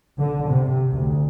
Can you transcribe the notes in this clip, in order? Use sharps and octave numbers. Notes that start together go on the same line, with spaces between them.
D3
C3
D2